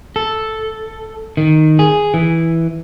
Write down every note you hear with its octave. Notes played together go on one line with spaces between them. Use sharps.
A4
D#3
G#4
E3